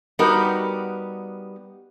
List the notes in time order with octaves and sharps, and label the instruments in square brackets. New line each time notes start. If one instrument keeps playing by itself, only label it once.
[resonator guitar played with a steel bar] G3 B3 D#4 F#4 G4 A#4